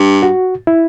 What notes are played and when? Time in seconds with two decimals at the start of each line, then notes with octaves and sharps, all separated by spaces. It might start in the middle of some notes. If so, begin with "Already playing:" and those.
Already playing: G2
0.23 F#4
0.67 E4